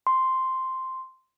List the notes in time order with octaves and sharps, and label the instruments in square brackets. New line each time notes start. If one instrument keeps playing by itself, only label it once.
[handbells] C6